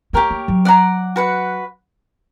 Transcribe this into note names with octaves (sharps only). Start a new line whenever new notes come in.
A#3 G4 A#4 C#5 G5
A#3
F#3
D5 F#5 A#5
F#4 B4 F#5